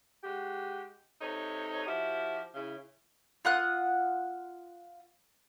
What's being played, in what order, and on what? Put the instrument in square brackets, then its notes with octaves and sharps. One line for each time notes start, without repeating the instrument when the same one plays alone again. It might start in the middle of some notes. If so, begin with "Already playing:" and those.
[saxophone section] G#3 F#4 G4
C3 D#4 A4 C#5
F3 E4 F#4 G4
C#3 E4
[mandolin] F4 F#5 D#6 F#6